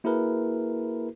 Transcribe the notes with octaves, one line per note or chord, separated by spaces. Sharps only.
A#3 E4 F#4 G#4 A#4 B4